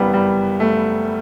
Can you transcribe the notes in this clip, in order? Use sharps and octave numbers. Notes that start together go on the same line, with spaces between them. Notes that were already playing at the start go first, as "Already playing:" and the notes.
Already playing: F#1 F#2 E3 G3 B3
G3
A3